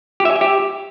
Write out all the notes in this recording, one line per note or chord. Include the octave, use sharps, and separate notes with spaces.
G4
E5
G#5
E5
G4